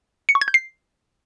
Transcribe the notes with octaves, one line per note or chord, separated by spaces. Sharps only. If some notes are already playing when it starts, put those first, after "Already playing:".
C#7
C#6
G#6
G6
C7